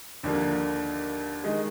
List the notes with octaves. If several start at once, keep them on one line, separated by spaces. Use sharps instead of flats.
D#2 D3 F3 A#3
D#3 G#3 D#5